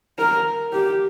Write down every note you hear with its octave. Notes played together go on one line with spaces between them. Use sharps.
A#4
G4